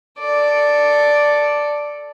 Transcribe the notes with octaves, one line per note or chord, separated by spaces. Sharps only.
A4 D5